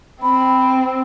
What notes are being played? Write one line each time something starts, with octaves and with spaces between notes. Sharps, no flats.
C4 B5